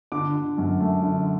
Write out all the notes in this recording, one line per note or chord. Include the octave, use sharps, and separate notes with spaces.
D3 D6
D3
F#2
A3
D3